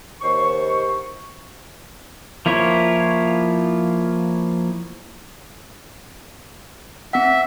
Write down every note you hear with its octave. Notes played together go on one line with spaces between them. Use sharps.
D#2 C5 C#6
F3 A#3 E4 F4 C#5
C4 E5 F#5